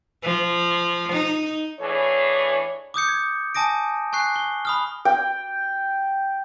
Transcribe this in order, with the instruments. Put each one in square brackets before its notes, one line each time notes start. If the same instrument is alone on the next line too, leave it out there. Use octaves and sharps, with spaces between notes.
[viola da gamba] F3
D#4
[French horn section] A2 E3 D4 G#4 C#5
[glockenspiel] D6 D#6 G6 C#7
G#6
G#5 A5 D#6 A#6 D7
G#5 C#6 F#6 C7
G7
B5 D#6 F6
[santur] G5